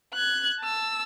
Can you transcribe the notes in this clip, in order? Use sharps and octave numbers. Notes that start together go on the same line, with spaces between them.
F#6 G#6
A5 E6